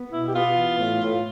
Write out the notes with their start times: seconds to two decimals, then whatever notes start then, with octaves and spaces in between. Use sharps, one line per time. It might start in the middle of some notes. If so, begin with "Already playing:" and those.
Already playing: B3
0.10 B2 E4
0.27 G4
0.33 B3 F4
0.55 E3
0.78 A2
1.01 A2